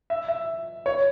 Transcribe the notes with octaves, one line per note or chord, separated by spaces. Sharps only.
E5
E5
C#5